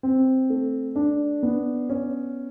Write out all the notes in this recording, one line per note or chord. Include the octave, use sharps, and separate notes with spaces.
C4
A3
D4
B3
C#4